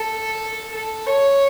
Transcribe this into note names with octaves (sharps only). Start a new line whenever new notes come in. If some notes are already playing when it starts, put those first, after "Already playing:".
Already playing: A4
A4
C#5